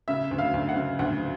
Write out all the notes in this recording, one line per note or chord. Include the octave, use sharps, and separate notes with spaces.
C#3 E5
D2
F5
D2
F#5
C#3
D2 F#5